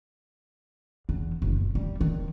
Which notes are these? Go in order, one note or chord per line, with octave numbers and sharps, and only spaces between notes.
E2
F#1
B2
G3
D#3